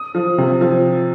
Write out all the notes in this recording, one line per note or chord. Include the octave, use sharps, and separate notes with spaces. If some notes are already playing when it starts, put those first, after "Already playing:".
Already playing: D#6
F3
C3
F3